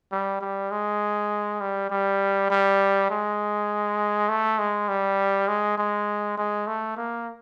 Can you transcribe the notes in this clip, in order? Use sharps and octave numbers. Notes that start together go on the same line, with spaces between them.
G3
G3
G#3
G3
G3
G3
G#3
A3
G#3
G3
G#3
G#3
G#3
A3
A#3